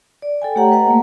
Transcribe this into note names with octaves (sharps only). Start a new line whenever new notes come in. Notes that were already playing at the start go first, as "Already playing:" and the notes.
D5
A4 G5 G#5
A3 G4 C#5 F#5 G5 A#5
B4 D#5 F#5 A#5
A3 A#3